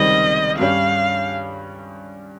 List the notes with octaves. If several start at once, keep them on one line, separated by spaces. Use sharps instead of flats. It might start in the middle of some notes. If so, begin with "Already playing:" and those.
Already playing: C#2 C3 D#3 G3 C4 D#5
G2 G3 C#4 F5